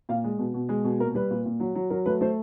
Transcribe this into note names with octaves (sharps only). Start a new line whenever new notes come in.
A#2 F5
G#3
B2
B2
G#3
B2
A#2 A#4
G3 B4
A#2
A#2
F#3
F#3
F#3 A#4
A3 B4
A3 C5